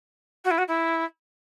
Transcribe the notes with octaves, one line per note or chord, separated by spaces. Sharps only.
F#4
E4
F#4
E4